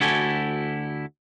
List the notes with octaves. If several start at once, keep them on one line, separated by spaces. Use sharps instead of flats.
D2 E4 F#4 G4 A4 G#5